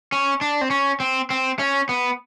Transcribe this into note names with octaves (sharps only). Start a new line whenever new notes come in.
C#4
D4
C4
C#4
C4
C4
C#4
B3